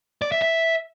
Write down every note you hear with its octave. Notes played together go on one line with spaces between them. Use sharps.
D5
E5
E5